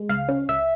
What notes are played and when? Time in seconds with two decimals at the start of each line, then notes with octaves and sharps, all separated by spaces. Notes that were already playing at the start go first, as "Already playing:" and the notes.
Already playing: G#3
0.09 C#2 F5
0.29 C#4
0.49 C#2 E5